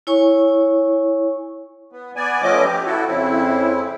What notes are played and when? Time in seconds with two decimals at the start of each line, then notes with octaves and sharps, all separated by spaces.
0.07 E4 C#5 G#5 C#6
1.92 B3
2.16 B3 D5 G#5
2.42 F3 A3 B3 C#4 D#5 D6
2.64 G4
2.86 E4 F#4 A4
3.06 F2 C#3 C4 E4